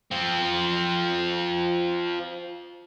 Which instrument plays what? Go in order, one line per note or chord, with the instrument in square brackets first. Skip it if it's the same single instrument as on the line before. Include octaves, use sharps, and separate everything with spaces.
[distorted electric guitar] F3 C4